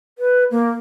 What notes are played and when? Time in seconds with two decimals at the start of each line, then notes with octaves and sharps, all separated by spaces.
0.18 B4
0.51 A#3